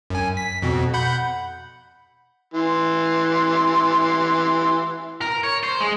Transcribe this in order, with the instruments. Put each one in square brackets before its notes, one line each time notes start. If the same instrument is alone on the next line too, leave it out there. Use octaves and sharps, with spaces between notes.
[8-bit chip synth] F#2 G#5
B6
F2 B2
F#5 B5 G6
[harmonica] E3 C6
[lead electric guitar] A#4
C#5
C5
G#3